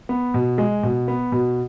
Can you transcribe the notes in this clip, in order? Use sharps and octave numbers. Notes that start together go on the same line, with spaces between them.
B3
B2
G#3
B2
B3
B2